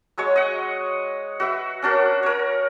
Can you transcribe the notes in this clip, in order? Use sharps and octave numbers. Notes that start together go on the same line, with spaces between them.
F#3 G#3 C#5 C#6
D#5 F#5
F#4 B4 E5
C#4 D4 F#4 A#4
A#4 C#5